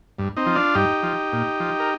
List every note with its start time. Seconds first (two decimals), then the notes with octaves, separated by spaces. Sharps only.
0.19 G2
0.36 C4 D#4
0.46 F3
0.55 D4 F4
0.74 G2 D#4 G4
1.03 F3
1.33 A#2
1.60 F3
1.80 A#4